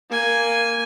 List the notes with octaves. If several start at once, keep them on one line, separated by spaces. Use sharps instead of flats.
A#3 G#5